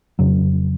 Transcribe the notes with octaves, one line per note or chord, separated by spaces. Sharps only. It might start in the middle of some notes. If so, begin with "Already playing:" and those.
F2 C#3 F#3